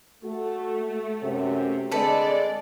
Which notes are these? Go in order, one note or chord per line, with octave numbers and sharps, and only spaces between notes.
A3 F#4 A4
F#2 C3 C#4
D3 G#3 C4 A4 B4 D5